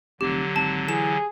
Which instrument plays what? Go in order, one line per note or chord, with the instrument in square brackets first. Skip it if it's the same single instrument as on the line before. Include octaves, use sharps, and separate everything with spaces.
[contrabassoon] F1 [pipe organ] D3 F#3 [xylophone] G4
[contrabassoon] G#1 [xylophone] A5
[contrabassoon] E3 [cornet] G#4 [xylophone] E7